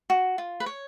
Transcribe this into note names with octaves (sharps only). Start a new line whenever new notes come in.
F#4
F4
B4
C#5